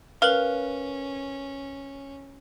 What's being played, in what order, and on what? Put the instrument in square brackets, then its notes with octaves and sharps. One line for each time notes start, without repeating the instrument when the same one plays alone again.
[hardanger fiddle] C#4 [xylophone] A#4 B4 F#7 [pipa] F5